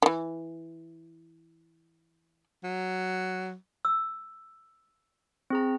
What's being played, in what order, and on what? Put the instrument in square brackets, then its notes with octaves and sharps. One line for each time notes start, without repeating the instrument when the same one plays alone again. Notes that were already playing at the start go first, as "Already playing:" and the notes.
[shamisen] D#3 E3
[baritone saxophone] F#3
[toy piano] E6
[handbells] C4 G#4 A#5